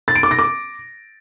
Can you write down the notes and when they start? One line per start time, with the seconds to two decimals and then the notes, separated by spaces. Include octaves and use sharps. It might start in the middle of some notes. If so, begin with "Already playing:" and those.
0.08 A6
0.16 D7
0.23 D6
0.31 A#6
0.39 D6